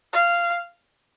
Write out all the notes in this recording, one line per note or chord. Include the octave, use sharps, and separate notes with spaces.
F5